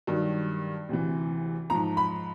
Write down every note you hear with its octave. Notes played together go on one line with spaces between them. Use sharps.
G2 D#3 F#3
D2 C3 E3
G#2 F3 A#5
B5